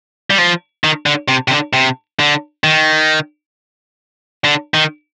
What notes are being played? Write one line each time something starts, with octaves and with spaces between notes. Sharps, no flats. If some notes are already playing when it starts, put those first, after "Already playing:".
G3
F3
D#3
D3
C3
C3
D3
C3
D3
D#3
D3
D#3